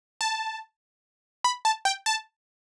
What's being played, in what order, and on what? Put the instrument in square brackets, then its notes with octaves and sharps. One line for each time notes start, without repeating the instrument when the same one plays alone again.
[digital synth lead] A5
B5
A5
G5
A5